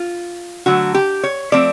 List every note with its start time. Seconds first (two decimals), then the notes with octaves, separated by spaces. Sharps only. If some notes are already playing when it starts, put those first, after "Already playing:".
Already playing: F4
0.66 D3 F#3 A3 F#4
0.94 G4
1.24 C#5
1.52 F3 A3 C4 D5